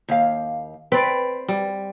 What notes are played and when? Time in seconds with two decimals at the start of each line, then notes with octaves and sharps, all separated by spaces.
0.08 D#2 F5
0.92 C4 B4 D5
1.48 G3